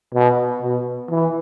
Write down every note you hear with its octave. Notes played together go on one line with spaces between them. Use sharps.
B2
B2
E3